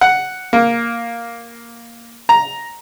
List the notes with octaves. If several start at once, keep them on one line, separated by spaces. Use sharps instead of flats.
F#5
A#3
A#5